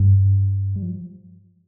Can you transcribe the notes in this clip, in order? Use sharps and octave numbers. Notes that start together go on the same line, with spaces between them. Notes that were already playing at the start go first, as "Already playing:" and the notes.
Already playing: G2
G3
F3